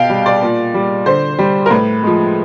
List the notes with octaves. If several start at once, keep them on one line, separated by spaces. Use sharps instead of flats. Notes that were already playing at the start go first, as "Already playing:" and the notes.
Already playing: B2 F5 G5
G3
D5
A#2
G3
D3 C5
G3
A#4
A2 B4
F3 G#3